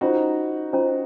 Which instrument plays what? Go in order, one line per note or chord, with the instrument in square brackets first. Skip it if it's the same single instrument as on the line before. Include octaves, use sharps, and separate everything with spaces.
[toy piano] C#4 F4 C5 D#5 A#5 [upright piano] D#4 F#4
[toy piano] C#4 F4 C5 D#5 A#5